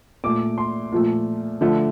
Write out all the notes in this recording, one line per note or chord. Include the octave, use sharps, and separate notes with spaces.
A#2 A3 D6
C6
A#2 F3 A3
D3 F3 A3